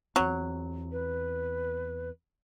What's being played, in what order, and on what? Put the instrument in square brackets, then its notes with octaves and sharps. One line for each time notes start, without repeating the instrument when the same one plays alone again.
[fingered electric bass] E2 C4 [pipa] F#3
[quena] B4